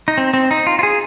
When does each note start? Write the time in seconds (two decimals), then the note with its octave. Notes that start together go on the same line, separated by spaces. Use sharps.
0.08 D#4
0.18 C4
0.34 C4
0.51 D#4
0.67 F4
0.79 F4
0.83 G#4